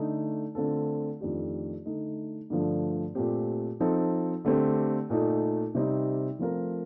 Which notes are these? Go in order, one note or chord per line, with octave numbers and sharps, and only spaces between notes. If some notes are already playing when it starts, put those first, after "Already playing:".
Already playing: D3 A3 D#4
D3 A3 C4 F4 A4
F2 D#3 A3 D4 G4
D3 A3 D#4
G2 D3 F3 A3
A#2 A3 C4 G4
F3 C4 D#4 A4
D3 A3 C4 G4
A#2 A3 D#4 A4
C3 G3 C4 D#4
F3 A3 C4 F4 A#4